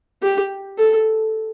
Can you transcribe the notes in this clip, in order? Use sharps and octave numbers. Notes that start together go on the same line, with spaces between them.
G4
A4